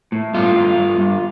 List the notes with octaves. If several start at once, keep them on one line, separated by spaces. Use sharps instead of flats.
A2
G2 F4
G2
G2
G2